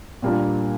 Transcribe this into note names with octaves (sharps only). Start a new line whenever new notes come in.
A#2 G3 A#3 D4 F4